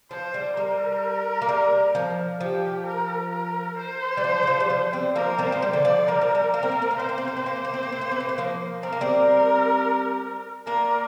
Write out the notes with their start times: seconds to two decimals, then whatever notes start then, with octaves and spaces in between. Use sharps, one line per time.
0.11 F3 C5
0.34 G3
0.57 G3 A#4
1.42 A#3
1.49 G3
1.95 F3
2.41 F3 G4
2.86 A#4
3.33 A#4
3.78 C5
4.17 G3
4.24 F3
4.43 D3
4.47 F3
4.60 G3
4.70 F3
4.93 G3 C4
5.16 F3 A#3 A#4
5.38 G3 C4
5.46 C5
5.52 F3
5.62 G3
5.73 D3 D5
5.85 F3
6.08 G3 A#4
6.21 F3
6.35 G3
6.53 A#3 A#4
6.63 C4
6.72 A#3
6.82 C4
6.91 A#3
6.99 C4 C5
7.09 A#3
7.18 C4
7.28 A#3
7.37 C4
7.46 A#3
7.56 C4
7.65 A#3
7.74 C4
7.83 A#3
7.92 C4
8.01 A#3
8.11 C4
8.20 A#3
8.29 C4
8.38 F3 A#3
8.83 C4 A#4
8.93 A#3
9.01 G3 C4
10.66 A#3 D4 A#4